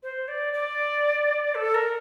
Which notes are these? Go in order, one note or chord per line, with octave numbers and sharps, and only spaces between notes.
C5
D5
D5
A4
A#4